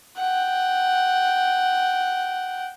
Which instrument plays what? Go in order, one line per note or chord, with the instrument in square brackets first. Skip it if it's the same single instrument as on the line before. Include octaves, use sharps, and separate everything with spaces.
[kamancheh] F#5 G5